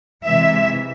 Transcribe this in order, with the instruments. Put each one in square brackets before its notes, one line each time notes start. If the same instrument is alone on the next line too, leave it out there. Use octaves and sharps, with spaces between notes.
[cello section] C3 E3 G#3 E5